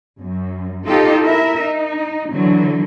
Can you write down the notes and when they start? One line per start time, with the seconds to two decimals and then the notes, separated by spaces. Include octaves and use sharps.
0.20 F#2
0.86 D#4 F4 G4 A4
1.23 E4 A#4 E5
1.60 D#4
2.31 D3 E3 F#3